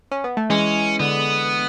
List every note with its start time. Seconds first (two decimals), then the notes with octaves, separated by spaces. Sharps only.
0.11 C#4
0.24 B3
0.37 A3
0.50 E3 G#3 C#4
0.99 D3 B3